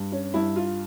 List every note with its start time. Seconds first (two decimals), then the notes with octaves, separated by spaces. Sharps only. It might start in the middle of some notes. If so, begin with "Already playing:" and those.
Already playing: G2
0.12 C#4
0.34 G2 E4
0.56 F4